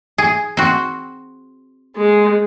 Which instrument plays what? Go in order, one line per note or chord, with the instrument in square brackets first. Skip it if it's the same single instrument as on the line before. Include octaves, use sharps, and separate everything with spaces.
[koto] G#4
C4 F#4
[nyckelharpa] G#3